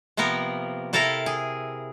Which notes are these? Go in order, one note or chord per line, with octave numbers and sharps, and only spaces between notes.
C3 F3 A#3 B3 A#4
C3 E4 A4 A#4 F5 A#5
G#4